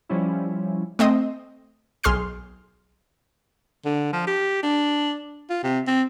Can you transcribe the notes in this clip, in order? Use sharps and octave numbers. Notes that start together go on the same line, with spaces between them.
F3 G3 C#4 E4
A3 C4 D#5
B1 G#4 C6 F6 C7
D3
F3
G4
D4
F4
C3
C4